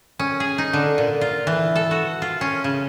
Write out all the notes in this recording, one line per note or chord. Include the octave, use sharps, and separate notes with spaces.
C#4
G#4
D#4
D3
A#2
F4
E3
A4
F#4
F4
C#4
C#3